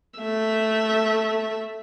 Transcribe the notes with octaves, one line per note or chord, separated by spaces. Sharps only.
A3 E5